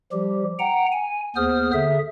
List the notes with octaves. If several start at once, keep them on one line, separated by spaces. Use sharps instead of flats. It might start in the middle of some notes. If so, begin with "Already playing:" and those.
F3 G3 G4
F#5 G5 A#5
G#5
D#2 B3 G#4 C5 D#6 F6
D3 G#4 E5